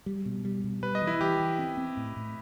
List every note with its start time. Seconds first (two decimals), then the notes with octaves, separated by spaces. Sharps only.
0.06 G3
0.25 B2
0.45 G3
0.64 B2
0.83 G3 B4
0.95 D#5
1.02 E3
1.07 E4
1.21 E3 G4
1.40 E3
1.59 C4
1.77 C4
1.97 A2
2.16 A2